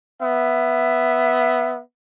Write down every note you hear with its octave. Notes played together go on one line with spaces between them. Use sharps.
B3 E5